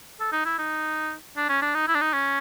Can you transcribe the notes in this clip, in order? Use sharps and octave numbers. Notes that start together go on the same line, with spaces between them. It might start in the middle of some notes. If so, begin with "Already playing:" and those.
A4
D#4
E4
D#4
D4
C#4
D4
D#4
E4
D4
D#4
C#4